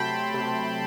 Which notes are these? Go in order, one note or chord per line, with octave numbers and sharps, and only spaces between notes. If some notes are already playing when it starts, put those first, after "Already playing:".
Already playing: C3 F#3 A3 G5 A5 B5 C6
C3